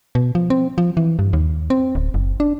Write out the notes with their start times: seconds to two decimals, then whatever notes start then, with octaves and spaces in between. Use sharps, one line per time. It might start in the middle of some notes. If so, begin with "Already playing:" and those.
0.15 B2
0.35 F3
0.50 C4
0.78 F3
0.97 E3
1.19 G2
1.33 D#2
1.70 C4
1.95 D1
2.14 F#1
2.40 D4